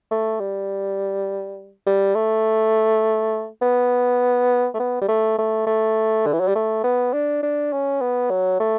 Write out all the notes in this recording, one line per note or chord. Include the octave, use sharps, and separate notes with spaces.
A3
G3
G3
A3
B3
A3
B3
G3
A3
A3
A3
D3
E3
F#3
G3
A3
B3
D4
D4
C#4
B3
F#3
A3